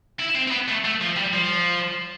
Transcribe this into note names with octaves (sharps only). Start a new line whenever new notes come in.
E4
C4
C4
B3
A3
A3
F3
G3
F3